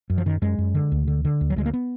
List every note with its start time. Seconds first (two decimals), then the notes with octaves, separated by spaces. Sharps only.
0.10 F#2
0.18 F3
0.26 F#2 D#3
0.42 F#2 G#3
0.58 F#2
0.74 D3
0.92 D2
1.07 D3
1.25 D3
1.41 D2
1.50 F#3
1.56 D2 G#3
1.66 A#3
1.73 B3